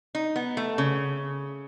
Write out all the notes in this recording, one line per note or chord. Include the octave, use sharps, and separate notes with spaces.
D#4
B3
A3
C#3